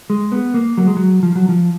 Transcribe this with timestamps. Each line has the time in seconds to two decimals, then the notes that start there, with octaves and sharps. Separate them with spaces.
0.10 G#3
0.32 B3
0.54 A#3
0.77 F#3
0.87 G#3
0.96 F#3
1.23 F3
1.35 F#3
1.49 F3